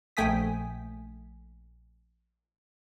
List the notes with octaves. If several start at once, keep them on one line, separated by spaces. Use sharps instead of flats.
A#1 A3 G5 G#5 D#6 B6